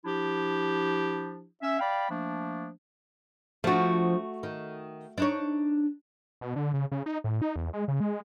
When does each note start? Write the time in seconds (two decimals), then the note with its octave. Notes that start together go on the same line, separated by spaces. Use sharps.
0.05 F3 D4 E4 G4
1.62 C#4 E5
1.79 D5 F5 G5 B5
2.09 F3 A3 A#3 D4
3.64 F3 A3 D4 F#4
4.43 D#3
5.18 D4 D#4 C#5
6.41 B2
6.56 D3
6.73 C#3
6.91 C#3
7.06 D#4
7.24 A2
7.42 D#4
7.56 E2
7.73 G#3
7.88 C#3
8.00 G#3